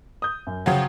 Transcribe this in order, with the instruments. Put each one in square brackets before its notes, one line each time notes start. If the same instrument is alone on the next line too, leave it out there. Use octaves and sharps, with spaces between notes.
[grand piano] D#6 G6
F#2
[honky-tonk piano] C#3 F3 F#3 [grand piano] F#4 F#5 G5